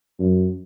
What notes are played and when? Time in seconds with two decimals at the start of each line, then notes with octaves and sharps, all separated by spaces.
0.19 F#2